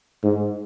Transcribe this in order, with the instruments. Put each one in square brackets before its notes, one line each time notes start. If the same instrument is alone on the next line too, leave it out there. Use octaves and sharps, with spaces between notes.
[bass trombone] G#2